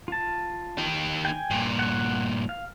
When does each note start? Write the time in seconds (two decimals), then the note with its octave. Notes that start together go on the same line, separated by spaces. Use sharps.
0.08 F4 A5
0.78 D#3 G4
1.25 G5 G#5
1.51 G2 A#2
1.79 F#5 C#6
2.49 F5